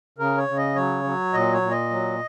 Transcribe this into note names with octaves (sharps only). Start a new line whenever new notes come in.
C#3 A#4
C#5
C#3
D#5
F#3 C#5
F#3
A#2 D#5
C#5
A#2
D#5
F#3